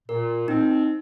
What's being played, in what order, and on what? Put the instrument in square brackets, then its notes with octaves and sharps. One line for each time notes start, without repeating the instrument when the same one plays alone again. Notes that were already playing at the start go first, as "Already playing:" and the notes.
[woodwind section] A#2 [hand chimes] A#4
[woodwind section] C4 [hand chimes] D#4